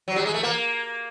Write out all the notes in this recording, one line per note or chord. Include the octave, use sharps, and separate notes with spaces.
F#3
G3
G#3
A3
A#3